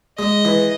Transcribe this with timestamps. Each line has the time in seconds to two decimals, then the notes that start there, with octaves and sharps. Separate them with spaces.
0.19 G#3 D#5
0.45 E3